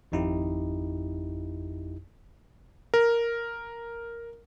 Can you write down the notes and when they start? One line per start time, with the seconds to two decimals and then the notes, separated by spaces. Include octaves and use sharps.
0.12 G#1 F2 D#4 E4 G4
2.94 A#4